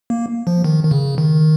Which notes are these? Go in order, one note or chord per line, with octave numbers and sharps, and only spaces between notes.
A#3
F3
D#3
D#3
C#3
D#3